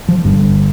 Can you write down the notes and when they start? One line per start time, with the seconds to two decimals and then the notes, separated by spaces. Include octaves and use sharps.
0.09 F3
0.24 G1 G2 D3